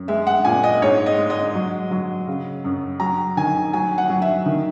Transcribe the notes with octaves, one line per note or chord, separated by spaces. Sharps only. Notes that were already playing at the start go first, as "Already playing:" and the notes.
Already playing: F#2
G#3 E5
F#5
A#2 G#5
D#5
G#2 C#5
D#5
G#3
D#5
F#3
F#3
C#3
F#2
F#3 A#5
D#3 G#5
F#3 G#5
F#5
F#3
E5
D#3